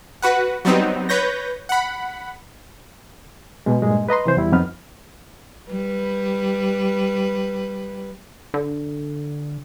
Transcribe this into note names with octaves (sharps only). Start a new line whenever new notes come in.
F#4 B4 F#5
F#3 G3 B3 C4 D#4
B4 C#5 G6 A#6
F#5 B5
B2 G#3
G2 A#2 G#3
B4 D#5 A#5 C6
C3 E3 C5
E2 G3 E4
F2 B3 C4 D#4 B4 F6
G3 B4
D3